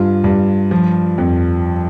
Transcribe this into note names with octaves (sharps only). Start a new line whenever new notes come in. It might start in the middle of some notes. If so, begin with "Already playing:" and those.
Already playing: G2 F4
G2
F3
F2